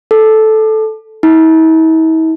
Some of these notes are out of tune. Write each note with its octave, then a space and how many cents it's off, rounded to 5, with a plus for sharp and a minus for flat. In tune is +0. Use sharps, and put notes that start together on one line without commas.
A4 -10
E4 -45